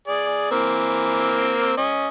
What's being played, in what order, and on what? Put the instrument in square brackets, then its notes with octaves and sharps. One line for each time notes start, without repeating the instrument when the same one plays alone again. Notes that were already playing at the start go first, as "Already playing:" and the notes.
[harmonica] G#4 D5
E3 A#3 C4
C#4 D#5